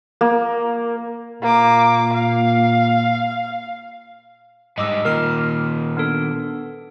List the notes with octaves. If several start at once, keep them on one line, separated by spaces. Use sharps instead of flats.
A#3
A#2 A#3 D6
F5
G#2 G3 D#5 D6 E6
A#2 D#3 A#4 F6
B3 D4 A4